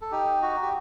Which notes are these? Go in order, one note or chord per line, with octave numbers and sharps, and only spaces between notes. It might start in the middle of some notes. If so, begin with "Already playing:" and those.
A4
D#4 G4
F#4
G4